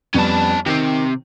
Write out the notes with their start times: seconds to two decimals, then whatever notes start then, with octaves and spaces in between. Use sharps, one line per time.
0.15 F2 G3 B3 C#4 A5
0.66 C3 D#3 C4